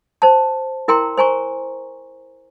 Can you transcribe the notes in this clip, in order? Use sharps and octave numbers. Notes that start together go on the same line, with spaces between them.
C5 A5
E4 A#4 G5 A#5 C6
C5 G#5 A#5 C#6